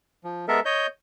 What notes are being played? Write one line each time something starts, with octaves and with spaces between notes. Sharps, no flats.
F3
G#3 B3 A4 A#4 E5
C#5 D#5 G6